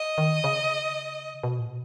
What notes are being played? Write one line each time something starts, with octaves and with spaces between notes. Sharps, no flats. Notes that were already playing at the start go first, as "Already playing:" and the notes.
Already playing: D#5
D#3
C#3
B2
A#2
B2